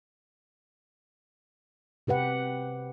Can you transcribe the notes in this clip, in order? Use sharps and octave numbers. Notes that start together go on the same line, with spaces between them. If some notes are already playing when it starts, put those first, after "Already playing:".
C3 G4 B4 F#5